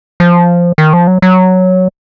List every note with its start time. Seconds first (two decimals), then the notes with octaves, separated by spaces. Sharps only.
0.20 F3
0.78 D#3
0.93 F3
1.07 F#3
1.22 F#3